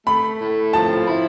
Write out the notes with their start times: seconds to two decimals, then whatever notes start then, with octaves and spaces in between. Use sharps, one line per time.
0.07 A3 B5
0.41 A2
0.73 F3 A5
1.07 E4